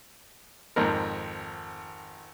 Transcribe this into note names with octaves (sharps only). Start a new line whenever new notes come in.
G#1 F2 A#4